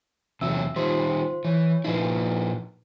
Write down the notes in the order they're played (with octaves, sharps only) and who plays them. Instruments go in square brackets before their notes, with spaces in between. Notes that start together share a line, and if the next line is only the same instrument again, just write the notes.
[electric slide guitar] E2 C3 F#3 [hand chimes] E5 E6
[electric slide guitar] D#3 G3 [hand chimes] F4 C5 C6
[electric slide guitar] E3 [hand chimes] C#5
[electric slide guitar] A#2 F3 E4 [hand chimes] D#4 B4